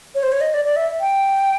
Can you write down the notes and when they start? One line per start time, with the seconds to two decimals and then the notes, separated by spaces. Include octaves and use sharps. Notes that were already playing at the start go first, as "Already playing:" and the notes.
0.15 C#5
0.23 C5
0.32 C#5
0.41 D#5
0.54 D5
0.65 D5
0.76 E5
1.00 G5